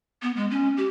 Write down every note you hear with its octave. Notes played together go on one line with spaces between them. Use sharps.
B3
G#3
C#4
G4